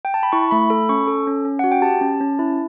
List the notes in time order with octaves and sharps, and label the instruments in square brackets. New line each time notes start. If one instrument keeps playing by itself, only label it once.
[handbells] G5
A5
B5
E4 C#6
A3 B5
A4 B5
C#4 C#6
A4
C#4
C#4
F#4 F#5
G5
G4 A5
C#4
C#4
E4